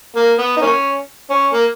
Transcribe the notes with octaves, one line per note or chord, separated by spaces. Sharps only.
A#3
B3
D#4
A#3 C#4
C#4
A#3